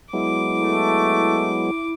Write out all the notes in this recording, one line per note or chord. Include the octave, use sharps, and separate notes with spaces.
F#3 G#3 B3 E4 D6
A3